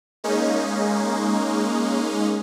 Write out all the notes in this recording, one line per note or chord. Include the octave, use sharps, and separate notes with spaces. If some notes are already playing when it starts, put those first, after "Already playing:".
G#3 A#3 C#4 D#4